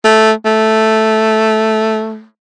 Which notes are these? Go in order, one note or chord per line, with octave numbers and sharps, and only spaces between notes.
A3
A3